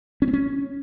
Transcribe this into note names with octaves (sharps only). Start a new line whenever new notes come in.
C#4
C4
C#4